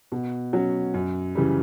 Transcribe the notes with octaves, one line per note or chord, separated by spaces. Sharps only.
B2
F#3 C#4
F#2
C#3 E3 G3